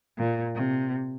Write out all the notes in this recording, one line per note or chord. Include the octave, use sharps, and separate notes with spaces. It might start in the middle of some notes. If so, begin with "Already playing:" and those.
A#2
C3